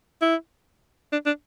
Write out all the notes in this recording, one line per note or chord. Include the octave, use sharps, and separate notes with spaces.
E4
D4
D4